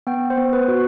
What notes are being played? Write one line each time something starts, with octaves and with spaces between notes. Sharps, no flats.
B3 G5
C5
B3
B4
F#4